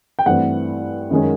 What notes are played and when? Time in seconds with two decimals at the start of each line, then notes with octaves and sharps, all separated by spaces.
0.19 G5
0.26 G2 E3 A3 C4 F#5
1.10 F#2 D#3 G#3 C#4